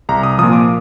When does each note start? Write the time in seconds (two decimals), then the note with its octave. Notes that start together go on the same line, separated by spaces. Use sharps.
0.09 C2 A#5
0.23 D#6
0.38 A#2 F3 D#6
0.53 D6